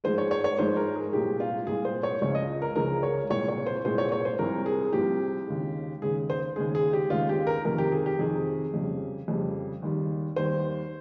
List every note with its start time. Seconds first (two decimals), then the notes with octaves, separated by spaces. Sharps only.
0.04 G#2 F3 G#3 C5
0.18 C#5
0.31 C#5
0.44 C#5
0.58 G#2 F3 G#3 C5
0.77 A#4
0.95 G#4
1.13 C2 A#2 G#3 G4
1.40 F4
1.67 C2 A#2 G#3 G#4
1.85 C5
2.03 C#5
2.21 C#2 C#3 F3 G#3 C#5
2.35 D#5
2.62 A#4
2.76 C#2 C#3 F3 G#3 A#4
3.03 C#5
3.30 C2 A#2 G#3 C#5
3.49 C#5
3.66 C5
3.84 C2 A#2 G#3 C5
3.98 C#5
4.12 C#5
4.25 C5
4.39 C2 C3 F3 A#4
4.66 G#4
4.93 C2 C3 F3 G4
5.48 D#2 C#3 G#3
6.02 D#2 C#3 G#3 G#4
6.30 C5
6.56 D#2 C#3 G#3 G#4
6.75 G#4
6.93 G4
7.10 D#2 C#3 G#3 F4
7.29 G4
7.47 A#4
7.65 F2 C3 D#3 A#4
7.78 G4
7.92 G#4
8.06 G4
8.19 F2 C3 D#3 G#4
8.74 F2 C#3 G3
9.28 F2 C#3 G3
9.82 D#2 D#3 G3
10.36 D#2 D#3 G3 C5